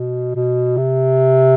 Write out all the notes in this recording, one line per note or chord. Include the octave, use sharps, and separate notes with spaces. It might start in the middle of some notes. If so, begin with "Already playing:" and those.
Already playing: B2
B2
C3